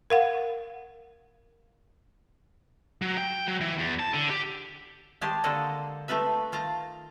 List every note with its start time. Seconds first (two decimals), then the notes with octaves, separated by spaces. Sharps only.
0.10 A#4 F5 F#5
3.02 F#3
3.17 G5
3.48 F#3
3.61 E3
3.78 E2
3.99 A5
4.14 D3
4.30 G4
5.21 D#3 G#3 G4 G#4 C5 A5
5.44 D3 G#3 A#3 A4 C5 D#5
6.08 A3 D#4 F4 B4 E5
6.52 D#3 F4 A5 A#5